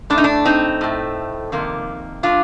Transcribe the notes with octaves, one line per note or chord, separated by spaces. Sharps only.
A2 A3 D4
D#4
D4
C4 D#4
A2 A3
F2 C3 D#3 A#3
F3 A3 D4 F4